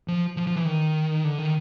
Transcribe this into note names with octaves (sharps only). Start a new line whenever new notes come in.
F3
F3
F3
E3
D#3
D3
D#3